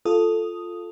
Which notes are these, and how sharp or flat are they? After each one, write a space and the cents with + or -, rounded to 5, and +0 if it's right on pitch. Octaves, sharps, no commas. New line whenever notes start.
F4 +0 A4 +0 D#6 +0